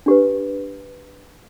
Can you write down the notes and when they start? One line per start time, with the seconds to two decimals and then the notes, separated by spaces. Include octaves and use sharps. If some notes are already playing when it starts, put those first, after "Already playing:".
0.06 D4 G4 B4